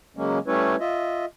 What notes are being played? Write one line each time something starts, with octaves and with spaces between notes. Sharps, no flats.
C#3 F#3 G#3 A#3 C#4
G3 A3 C#4 E4 B4 C#5
F4 D#5 E5